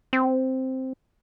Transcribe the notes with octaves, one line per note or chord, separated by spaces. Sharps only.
C4